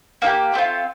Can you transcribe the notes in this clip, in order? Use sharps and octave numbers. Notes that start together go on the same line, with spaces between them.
A#3 D#4 G4
A3 C4 F4